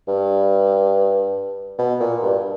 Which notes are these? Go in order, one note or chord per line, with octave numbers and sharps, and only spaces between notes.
G2
B2
A#2
G2